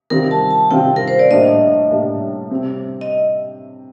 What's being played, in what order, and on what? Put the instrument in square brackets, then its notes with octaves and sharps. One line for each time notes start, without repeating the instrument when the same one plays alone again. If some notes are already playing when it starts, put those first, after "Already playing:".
[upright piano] C3 D#3 G3 C4 F4 [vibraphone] A#4
[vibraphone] A5
A5
[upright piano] C3 D#3 G3 C4 F4 [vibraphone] G5
[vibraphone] A#4
C5
D5
[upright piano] A2 G3 A#3 D4 [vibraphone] D#5
[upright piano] A2 G3 A#3 D4
C3 G3 C4 G4
[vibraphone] D#5